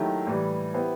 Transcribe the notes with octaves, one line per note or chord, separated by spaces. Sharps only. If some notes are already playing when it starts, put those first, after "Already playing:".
Already playing: D#3 F#3 A3 E4 G4
A2 E3 G3
B3 E4 G4 C5